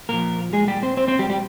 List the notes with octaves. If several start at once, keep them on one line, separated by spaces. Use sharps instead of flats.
A#2 F3 A#3 A#4
G#3 G#4
G3 G4
C4 C5
C4 C5
C4 C5
G3 G4
G3 G4